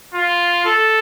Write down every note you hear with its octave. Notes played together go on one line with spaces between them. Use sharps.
F4
A4